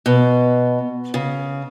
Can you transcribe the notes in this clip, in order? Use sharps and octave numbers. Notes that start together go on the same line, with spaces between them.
B2
C#3